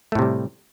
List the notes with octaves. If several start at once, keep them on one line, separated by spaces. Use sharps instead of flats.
A2 C3 G3 A3